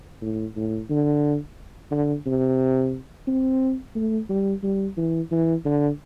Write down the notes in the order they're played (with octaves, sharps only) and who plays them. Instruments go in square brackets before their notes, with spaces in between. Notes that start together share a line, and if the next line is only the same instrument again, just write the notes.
[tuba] A2
A2
D3
D3
C3
C4
A3
G3
G3
E3
E3
D3